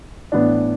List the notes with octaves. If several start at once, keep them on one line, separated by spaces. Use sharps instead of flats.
A2 E3 B3 D4